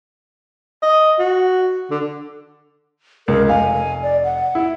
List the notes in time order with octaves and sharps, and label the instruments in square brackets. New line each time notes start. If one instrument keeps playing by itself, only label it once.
[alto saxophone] D#5
F#4
D3
[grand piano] C#2 [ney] A#4
[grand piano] F1 F5 [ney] G#5
[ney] D5
F#5
[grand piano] E4